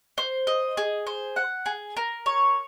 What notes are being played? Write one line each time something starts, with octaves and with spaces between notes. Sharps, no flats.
C5
D#5
G#4
C5
F#5
G#4
A#4
C#5